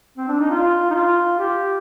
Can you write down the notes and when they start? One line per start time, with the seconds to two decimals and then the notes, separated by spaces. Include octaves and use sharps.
0.18 C4
0.28 D4
0.39 D#4
0.50 F4
0.90 D#4
0.94 F4
1.39 G4